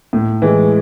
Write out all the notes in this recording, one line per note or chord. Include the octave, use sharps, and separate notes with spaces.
A2
E3 G#3